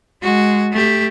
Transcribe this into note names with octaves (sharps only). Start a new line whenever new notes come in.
G#3 F#4
A3 G4